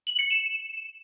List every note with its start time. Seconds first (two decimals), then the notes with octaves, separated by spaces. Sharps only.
0.07 F#7
0.19 C#7
0.31 E7